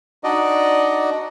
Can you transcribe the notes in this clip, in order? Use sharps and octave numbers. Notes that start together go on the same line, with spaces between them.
D4 D#4 F#4 D5 D#5